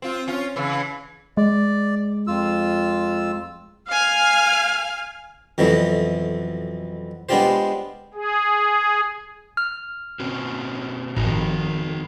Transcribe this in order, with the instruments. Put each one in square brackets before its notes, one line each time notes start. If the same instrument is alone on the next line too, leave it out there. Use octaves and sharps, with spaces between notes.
[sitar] C4 F4
C#4 F4
C#3 E3
[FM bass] G#3 [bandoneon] D5
[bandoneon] F2 F4 E6
[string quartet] F5 G#5 F6
[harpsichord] F2 B2 E3 F#3 A3
G#3 B3 D4 F4 G4 C5
[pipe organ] G#4
[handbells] F6
[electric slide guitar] B2 C4 F#4 [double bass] C#4
[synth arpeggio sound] G1 A2 [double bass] F2 D#3 [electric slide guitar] D#4 F#4